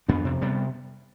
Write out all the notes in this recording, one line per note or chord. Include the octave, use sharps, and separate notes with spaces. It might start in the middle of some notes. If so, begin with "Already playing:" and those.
F2 B3 D4
C3
C3 G3 B3